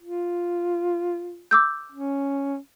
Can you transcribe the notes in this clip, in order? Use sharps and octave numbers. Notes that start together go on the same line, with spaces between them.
F4
D6 E6 G6
C#4